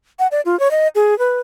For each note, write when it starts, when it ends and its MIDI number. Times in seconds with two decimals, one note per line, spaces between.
0.19 0.27 78
0.31 0.41 74
0.45 0.58 65
0.60 0.71 73
0.71 0.88 75
0.95 1.17 68
1.19 1.41 71